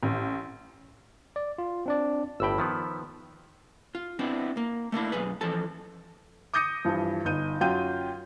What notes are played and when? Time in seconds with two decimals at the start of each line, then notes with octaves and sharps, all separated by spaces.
0.03 A1
1.36 D5
1.58 F4
1.86 C4 D4 D5
2.40 G1 A2 G5 B5 E6
2.58 D#3 F3 B3
3.95 F4
4.19 B3 C4 D4 E4
4.57 A#3
4.92 A3 A#3 D4 E4
5.12 B1 F#2 G#4 B4
5.41 E3 F3 A4 A5
6.54 D6 D#6 G6 A#6 C#7 D#7
6.85 G2 E3 F3
7.25 G1 D#4 G6 D#7
7.61 F#2 F#3 F4 G5 G6 D#7